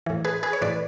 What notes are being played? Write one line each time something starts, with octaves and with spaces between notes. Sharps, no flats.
A2 E3
G#4 B4
G#4 B4
C#5
A2 E3 B4 D5